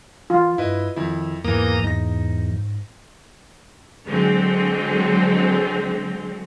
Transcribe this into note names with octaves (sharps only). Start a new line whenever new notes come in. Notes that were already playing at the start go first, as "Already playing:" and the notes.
E3 F4
G2 E4 B4 D#5
F2 D#3 E4
E2 G#2 E3 A#3 A#5 D#6
E2 D#4 A#6
D3 F#3 G#3 C4